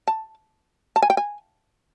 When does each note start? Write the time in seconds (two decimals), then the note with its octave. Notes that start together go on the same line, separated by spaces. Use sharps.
0.08 A5
0.96 A5
1.03 G#5
1.10 G5
1.17 G#5